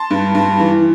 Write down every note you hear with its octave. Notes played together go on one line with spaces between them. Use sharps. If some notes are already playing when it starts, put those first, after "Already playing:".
Already playing: A5 C6
G2
G2
E3